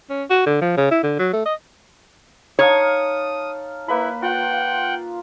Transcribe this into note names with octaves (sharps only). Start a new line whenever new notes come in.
C#4
F#4
D3
F3
C#3
E4
D3
F#3
A3
D#5
D#4 C#5 F5 A5 D#6
A#3 E4 B4 B5
F4 F#5 G5